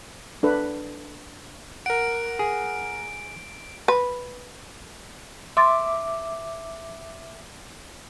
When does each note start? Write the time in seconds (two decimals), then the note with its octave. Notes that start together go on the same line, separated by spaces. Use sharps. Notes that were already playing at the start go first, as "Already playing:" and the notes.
0.43 D4 A4 B4
1.86 A#4 F#5 D7
2.39 G#4
3.88 B4
5.57 E5 C6 D6 A6